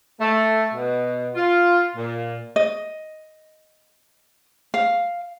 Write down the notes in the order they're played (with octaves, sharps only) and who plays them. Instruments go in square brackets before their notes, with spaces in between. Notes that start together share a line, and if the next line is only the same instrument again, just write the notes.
[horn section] A3
B2
F4
A#2
[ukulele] D#5
F5